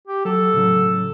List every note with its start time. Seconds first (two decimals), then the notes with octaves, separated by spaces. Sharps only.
0.08 G4
0.25 F#3 A4
0.54 A2 C#3 F#3